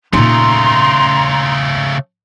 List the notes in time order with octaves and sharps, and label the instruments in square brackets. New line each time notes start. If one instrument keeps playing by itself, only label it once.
[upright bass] A#2 D#4 [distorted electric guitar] C#3 A3 [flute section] A#5 C6